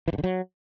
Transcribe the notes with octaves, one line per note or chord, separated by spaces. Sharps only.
E3
G2
D3
F#3